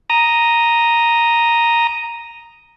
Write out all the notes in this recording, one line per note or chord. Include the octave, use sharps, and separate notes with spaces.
A#5 D#6